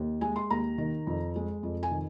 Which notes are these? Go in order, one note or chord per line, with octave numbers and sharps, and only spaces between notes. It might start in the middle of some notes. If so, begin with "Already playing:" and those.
Already playing: D#2
G#3 G#5
C6
D#2 A#5
D#3
F2
G#3
F2
G#5
D#3